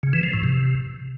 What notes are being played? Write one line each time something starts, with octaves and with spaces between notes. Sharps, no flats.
C#3
E3
F3
A2
C3